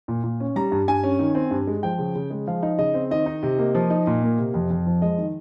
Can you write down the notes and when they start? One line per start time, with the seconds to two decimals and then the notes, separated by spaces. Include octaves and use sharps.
0.08 A#2
0.23 A#2
0.40 C#4
0.56 G3 A#5
0.72 G2
0.88 G2 G#5
1.04 C#4
1.19 D#3
1.35 C4
1.51 G2
1.67 G#3
1.83 F3 G5
1.99 C#3
2.15 C#3
2.30 G#3
2.47 F3 F5
2.63 D#4
2.78 C#3 D#5
2.94 C4
3.11 D#3 D#5
3.26 D#4
3.43 C3
3.58 A#3
3.75 F3
3.90 D#4
4.07 A#2
4.23 A#3
4.38 C3
4.54 F2
4.70 F2
4.86 F3
5.02 G#3 D#5
5.18 D#3